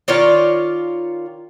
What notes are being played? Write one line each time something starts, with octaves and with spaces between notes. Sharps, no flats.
D#3 F4 C#5 D5